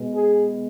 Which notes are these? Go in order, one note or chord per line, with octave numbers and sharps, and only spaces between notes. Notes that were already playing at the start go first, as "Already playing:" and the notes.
Already playing: B2 G#3 B3
G#4